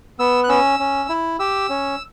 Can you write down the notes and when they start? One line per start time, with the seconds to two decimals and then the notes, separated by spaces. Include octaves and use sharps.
0.19 B3 E6
0.44 F#6
0.49 C#4 E6
0.79 C#4
1.09 E4
1.39 G4 E6
1.69 C#4